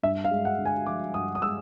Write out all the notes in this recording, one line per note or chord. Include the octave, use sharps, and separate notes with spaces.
G2 E5
F5
G#3
F#5
D3
G#5
F3 D6
G2 D#6
D#6
G#3 E6